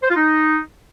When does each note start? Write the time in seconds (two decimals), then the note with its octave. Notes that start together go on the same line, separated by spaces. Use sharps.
0.02 C5
0.09 F4
0.16 D#4